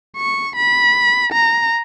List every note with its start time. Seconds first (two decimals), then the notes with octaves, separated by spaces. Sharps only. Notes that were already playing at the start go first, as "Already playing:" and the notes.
0.17 C#6
0.56 B5
1.33 A#5